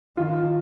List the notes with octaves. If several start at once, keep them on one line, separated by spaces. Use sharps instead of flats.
D#3 F4